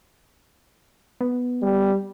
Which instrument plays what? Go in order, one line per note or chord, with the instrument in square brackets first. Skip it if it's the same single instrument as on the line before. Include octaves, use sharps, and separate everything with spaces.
[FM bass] B3
[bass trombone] G3